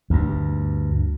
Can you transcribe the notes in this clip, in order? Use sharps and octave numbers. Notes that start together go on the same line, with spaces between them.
D2 G2